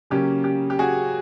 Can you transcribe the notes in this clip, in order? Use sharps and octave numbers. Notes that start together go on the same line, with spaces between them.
C#3 F#3 A#3 C#4 G4
G4
G4
F#4 G#4